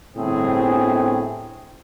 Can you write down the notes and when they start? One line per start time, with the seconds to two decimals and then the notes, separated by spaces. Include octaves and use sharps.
0.16 G1 A2 C4 G#4